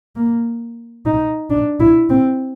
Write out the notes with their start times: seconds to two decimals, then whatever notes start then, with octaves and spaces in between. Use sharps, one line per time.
0.16 A#3
1.05 D#4
1.50 D4
1.80 E4
2.09 C4